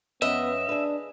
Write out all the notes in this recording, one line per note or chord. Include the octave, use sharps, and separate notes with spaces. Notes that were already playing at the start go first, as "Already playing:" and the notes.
F2 B3 C#4 B4 D#5 E5
D4 G#4 B4